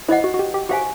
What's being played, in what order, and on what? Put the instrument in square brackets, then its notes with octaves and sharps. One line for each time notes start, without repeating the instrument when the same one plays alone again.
[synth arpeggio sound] E4 [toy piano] C5 D#5 F#5
[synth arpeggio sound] F#4
F#4
G4
G4
[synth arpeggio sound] F#4 [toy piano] G4 C5 F5 G#5